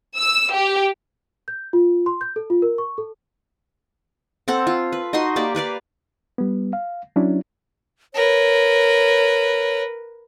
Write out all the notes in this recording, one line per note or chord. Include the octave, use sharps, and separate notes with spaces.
E6
G4
G6
F4
C6
G6
A4
F4
A#4
C#6
A4
C4 A4 F#5
F4
B4
D#4 F#4 D#5 C6
A#3 G4 D5
A#3 B4 D5 F5
G3 B3
F5
F#3 C#4 D4 E4
A#4 B4 C#5